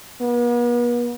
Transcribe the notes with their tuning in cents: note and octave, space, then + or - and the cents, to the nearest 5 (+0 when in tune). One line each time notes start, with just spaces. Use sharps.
B3 -45